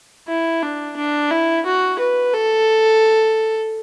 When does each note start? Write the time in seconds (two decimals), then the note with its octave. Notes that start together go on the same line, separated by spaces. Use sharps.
0.28 E4
0.62 D4
0.97 D4
1.30 E4
1.66 F#4
1.99 B4
2.33 A4